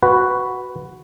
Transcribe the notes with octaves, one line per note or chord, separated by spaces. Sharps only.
F#4 B4